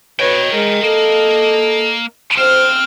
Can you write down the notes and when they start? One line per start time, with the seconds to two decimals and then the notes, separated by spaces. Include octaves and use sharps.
0.20 B2 B4 C#5 D#5 G5
0.52 G#3 A#4
0.83 A#3 A4 D#5
2.38 C4 C5 F6